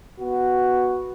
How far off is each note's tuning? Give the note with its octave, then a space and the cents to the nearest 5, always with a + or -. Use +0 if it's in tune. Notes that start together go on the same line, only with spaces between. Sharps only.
B3 +0 F#4 +0